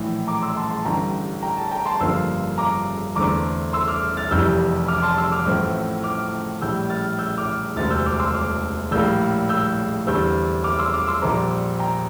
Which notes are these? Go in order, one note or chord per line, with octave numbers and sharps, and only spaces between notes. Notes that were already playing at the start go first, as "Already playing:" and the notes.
Already playing: A#1 A2 E3
A#5 D6
C6 E6
A5 C6
A5 C6
A1 G2 D3 G5 A#5
G5 A#5
A5
G5 A#5
A5 C6
G1 F2 D3 F3 A#3 C6 E6
A#5 D6
E2 D3 A3 C4 A#5 D6
C6 E6
D6 F6
F6 A6
F1 F2 C3 E3 G3 E6 G6
D6 F6
A5 C6
C6 E6
D6 F6
A1 A2 F3 A3 C4
D6 F6
A#1 A2 G3 E6 G6
F6 A6
E6 G6
D6 F6
E1 D2 C3 F6 A6
E6 G6
D6 F6
C6 E6
D6 F6
A#1 A2 G3 A#3 E6 G6
E6 G6
E2 D3 G3 C4 E6 G6
D6 F6
C6 E6
D6 F6
C6 E6
A#1 A#2 G3 C4 A#5 D6
G5 A#5